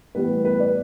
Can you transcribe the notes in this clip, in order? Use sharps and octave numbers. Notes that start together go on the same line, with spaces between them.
A2 E3 G3 B3 B4
B4
D5